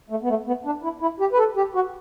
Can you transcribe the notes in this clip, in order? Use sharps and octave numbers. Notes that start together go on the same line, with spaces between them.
A3
B3
A3
B3
D4
E4
E4
G4
B4
A4
G4
F#4